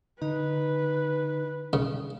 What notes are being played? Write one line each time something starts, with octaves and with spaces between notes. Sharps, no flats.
D3 D#4 B4
C#3